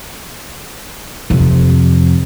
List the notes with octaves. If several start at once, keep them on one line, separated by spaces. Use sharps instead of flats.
F2 C3